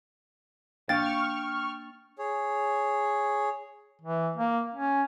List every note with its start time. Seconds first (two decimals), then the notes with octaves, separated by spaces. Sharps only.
0.89 A#3 D4 F5 G5 C#6 F6 A6
2.19 G#4 C#5
4.02 E3
4.37 A#3
4.75 C#4